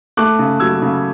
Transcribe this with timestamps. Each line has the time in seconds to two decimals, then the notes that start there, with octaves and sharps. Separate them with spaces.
0.17 A3 D6 F#6
0.39 C#3
0.60 F#3 E6 G#6
0.82 C#3